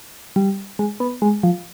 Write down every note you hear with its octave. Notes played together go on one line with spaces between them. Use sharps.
G3
G#3
B3
G#3
F3